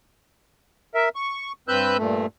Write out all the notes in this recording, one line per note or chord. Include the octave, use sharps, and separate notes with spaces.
A#4 E5
C#6
G2 C4 B4 E6 F#6 G6
G2 A#2 A3